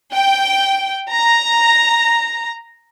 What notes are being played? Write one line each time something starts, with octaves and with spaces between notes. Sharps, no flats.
G5
A#5